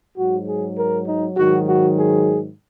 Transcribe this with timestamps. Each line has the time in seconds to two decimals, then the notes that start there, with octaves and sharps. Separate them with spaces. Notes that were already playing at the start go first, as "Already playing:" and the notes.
0.16 G#2 F#3 F#4
0.46 G#4
0.76 A#4
1.06 D#4
1.36 G#2 D#3 F#3 F#4
1.66 F#4
1.96 G#4